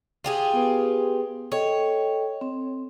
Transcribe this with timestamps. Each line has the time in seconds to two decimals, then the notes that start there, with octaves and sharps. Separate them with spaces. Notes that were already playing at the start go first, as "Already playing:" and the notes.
0.24 F4 G4 G#4
0.53 B3 B4
1.52 A4 C#5 D#5 G5
2.41 C4